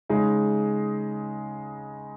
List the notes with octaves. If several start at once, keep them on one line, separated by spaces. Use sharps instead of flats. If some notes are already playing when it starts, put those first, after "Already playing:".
C#3 G#3 D#4 G#4